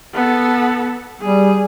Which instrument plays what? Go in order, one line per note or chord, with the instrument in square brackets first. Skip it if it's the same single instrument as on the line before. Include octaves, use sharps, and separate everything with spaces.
[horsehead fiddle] B3 A4
[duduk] G3 [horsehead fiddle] G#4